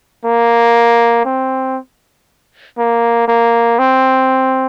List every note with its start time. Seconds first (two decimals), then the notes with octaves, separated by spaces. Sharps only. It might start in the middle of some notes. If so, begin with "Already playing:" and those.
0.25 A#3
1.25 C4
2.78 A#3
3.28 A#3
3.79 C4